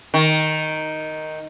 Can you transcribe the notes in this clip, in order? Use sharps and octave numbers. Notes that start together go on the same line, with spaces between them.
D#3